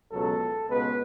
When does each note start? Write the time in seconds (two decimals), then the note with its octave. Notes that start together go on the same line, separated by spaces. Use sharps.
0.12 C#2 B2 F#3 A4
0.69 C#2 B2 G#3 B3 B4